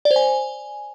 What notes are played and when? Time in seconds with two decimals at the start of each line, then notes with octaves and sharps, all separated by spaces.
0.05 D5
0.11 C5
0.16 G#5